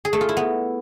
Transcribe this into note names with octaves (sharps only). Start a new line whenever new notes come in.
G#4
A3
F4
E4
B3